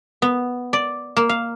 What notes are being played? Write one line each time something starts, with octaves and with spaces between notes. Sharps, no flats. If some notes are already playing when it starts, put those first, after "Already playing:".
B3
D5
A#3
F5